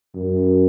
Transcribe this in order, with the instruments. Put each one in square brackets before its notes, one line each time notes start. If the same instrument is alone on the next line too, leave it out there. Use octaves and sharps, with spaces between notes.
[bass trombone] F#2